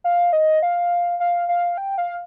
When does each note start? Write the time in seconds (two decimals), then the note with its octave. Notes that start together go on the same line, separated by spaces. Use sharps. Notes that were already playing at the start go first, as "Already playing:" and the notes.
0.04 F5
0.33 D#5
0.63 F5
1.20 F5
1.49 F5
1.77 G5
1.98 F5